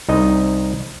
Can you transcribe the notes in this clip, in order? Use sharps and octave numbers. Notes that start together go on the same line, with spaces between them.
C2 D#4 D#5